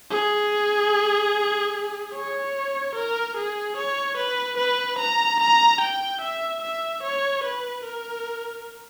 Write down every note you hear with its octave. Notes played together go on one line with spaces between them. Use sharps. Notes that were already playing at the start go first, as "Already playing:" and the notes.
G#4
C#5
A#4
G#4
C#5
B4
B4
A#5
A#5
G5
E5
E5
C#5
B4
A#4